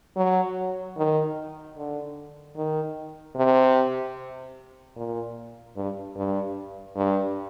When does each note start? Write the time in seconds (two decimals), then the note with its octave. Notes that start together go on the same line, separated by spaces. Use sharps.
0.17 F#3
0.97 D#3
1.77 D3
2.56 D#3
3.36 C3
4.96 A#2
5.77 G2
6.16 G2
6.96 G2